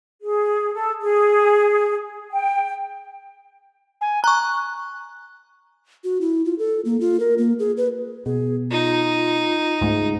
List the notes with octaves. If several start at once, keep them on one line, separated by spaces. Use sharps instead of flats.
G#4
A4
G#4
G5
G#5
A#5 C#6 F#6
F#4
E4
F4
A4
A#3
F4
A#4
A#3
G#4
B4
B2 G#4
D#4 F4
C#2 G#2 A3